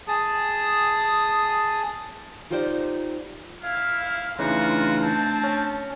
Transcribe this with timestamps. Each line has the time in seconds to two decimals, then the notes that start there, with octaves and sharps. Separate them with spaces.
0.08 G#4 A5 D#6
2.51 D#4 F4 G4 C5 D5
3.63 E4 F5
4.39 C#3 E3 A3 D4 D#4 F4 F#4
5.02 C4 A5
5.44 C#4